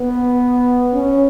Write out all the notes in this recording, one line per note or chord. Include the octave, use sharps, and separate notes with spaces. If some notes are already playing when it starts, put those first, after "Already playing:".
Already playing: B3
C#4